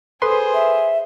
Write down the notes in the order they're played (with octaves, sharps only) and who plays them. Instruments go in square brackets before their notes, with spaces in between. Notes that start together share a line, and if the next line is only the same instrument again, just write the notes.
[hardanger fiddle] G#4 C5 [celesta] A4 D#6 [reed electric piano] B4 C6
[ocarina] E5